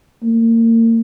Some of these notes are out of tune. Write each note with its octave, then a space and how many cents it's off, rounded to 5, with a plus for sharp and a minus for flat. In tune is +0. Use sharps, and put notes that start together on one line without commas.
A#3 -35